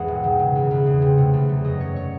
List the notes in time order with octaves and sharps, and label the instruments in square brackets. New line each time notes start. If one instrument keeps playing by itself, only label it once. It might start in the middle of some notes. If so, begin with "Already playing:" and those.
Already playing: [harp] G#1 E2 G#2 E3 G#3 F#5
E1
D#3
C#3
E2
E2
G#3
C3
A3
E2
F#3
F#2 D#5
A3 C#5
C#5